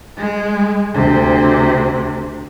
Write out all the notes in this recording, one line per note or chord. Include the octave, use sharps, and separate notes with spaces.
G#3
D2 C3